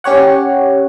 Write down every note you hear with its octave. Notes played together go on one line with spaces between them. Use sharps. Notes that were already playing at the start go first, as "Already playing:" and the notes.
C#4 G4 C#5 F#5